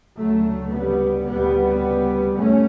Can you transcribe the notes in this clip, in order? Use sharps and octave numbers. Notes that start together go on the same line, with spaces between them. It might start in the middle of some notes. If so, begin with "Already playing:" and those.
D2 C#3 F#3 A3
G3 B3
D2 C#3 G3 B3
F#2 A3 C#4